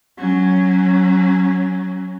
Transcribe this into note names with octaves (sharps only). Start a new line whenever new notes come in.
F#3 C#4